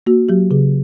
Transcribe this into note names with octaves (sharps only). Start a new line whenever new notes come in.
A#3 F#4
F#3 G4
C#3 G#4